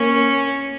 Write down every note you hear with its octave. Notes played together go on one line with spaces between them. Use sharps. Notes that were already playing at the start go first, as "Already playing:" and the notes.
Already playing: A#3 C#4